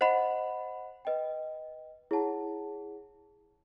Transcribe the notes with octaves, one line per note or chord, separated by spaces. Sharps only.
C5 D#5 F#5 B5
B4 D#5 G5
E4 G#4 C#5 F#5 A5